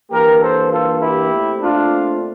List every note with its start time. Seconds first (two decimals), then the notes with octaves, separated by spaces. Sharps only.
0.11 G2 E3 A#3 G4 A#4
0.40 A4 C5
0.70 F4 A4
1.00 E4 G4
1.30 A#2 A3 C4
1.60 D4 F4